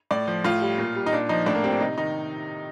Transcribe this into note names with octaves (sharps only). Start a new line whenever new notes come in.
A2 D5
F3
A2 F4
G3
A#2
G3
D#4
A#2 D4
F3 D#4
A2 D4
A#3
G3 C4
D4
C3 D#4
D#3 D#4